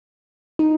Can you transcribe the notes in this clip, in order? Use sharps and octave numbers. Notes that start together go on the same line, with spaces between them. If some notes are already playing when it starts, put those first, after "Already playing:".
D#4